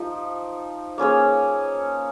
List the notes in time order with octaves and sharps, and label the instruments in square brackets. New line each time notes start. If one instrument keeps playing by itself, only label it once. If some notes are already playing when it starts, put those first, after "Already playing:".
Already playing: [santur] F3 D#4 G4
A#3 C#4 G#4 C#5